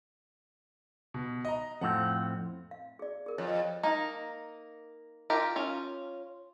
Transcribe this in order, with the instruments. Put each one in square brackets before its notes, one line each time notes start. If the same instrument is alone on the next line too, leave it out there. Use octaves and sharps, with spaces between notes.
[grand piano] B2
D#5 A#5
[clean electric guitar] F2 A2 C4 [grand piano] F4 F#5
[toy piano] F5
G#4 D5
G#4 A#4
[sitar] F2 [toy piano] G#4 C#5 D#5
[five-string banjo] A#3 D#4
F4 G4 A#4
C#4 F4